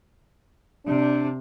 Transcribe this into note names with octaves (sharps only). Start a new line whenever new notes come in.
C3 D4